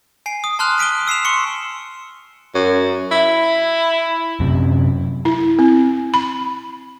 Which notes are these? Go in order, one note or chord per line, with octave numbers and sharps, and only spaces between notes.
G#5 C7 D7
D#6
A5 C6 F6 F#6 F7
D#6 B6 D7 D#7 G7
E6 C7 E7 F7
C6 C#6 C#7
F#2
E4
F#2 C3
E4
C4
B5